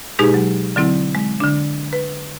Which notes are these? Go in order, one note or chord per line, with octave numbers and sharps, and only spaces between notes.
B2 G#3 D#4 G4 G#4
F#3
D3 F#3 C4 E4
G#3
D3 D4
B4